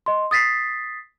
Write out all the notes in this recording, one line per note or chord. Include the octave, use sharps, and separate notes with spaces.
D#5 C6
D#6 A6 B6 C7